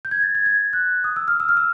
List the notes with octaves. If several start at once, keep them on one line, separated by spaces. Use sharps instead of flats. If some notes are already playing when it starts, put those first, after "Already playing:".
G6
G#6
A6
G#6
G#6
F#6
D#6
E6
F6
E6
F6
E6